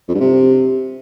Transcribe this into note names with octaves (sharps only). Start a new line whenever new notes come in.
F2
G2
C3